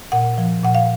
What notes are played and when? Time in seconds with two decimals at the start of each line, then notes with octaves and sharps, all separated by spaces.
0.12 A#2 F#5
0.38 F3
0.64 A#2 F#5
0.75 F5